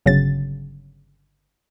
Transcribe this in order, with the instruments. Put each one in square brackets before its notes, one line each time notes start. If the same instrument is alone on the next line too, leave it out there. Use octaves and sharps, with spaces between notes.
[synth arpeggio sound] G1 C#3 F#3 A6